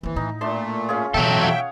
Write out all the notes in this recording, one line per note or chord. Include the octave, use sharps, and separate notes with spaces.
D#2 E3 C4
A2 D#4
A#2 A3 D4 A5 C6
C#4 F4 G#4
B2 E3 F#3 A4 E5 G5
C#5 F5 F#5